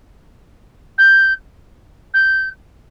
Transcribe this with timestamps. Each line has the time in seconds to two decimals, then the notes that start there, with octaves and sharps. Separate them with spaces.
0.98 G6
2.14 G6